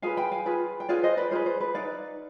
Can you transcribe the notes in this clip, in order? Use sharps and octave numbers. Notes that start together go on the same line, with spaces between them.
F4 G#4 B4 F5 G#5
G5 B5
F5 G#5
F4 G#4 B4
G5
F4 G#4 B4 D5 F5
C5 D#5
B4 D5
F4 G#4 B4 C5
C5
B4
D#4 B4 D5 F5